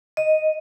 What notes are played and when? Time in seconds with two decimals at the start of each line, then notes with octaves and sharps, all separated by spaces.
0.17 D#5